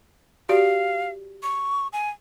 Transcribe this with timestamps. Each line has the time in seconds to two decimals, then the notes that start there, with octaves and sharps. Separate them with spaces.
0.49 F#4 G4 D5 F5
1.43 C#6
1.93 G#5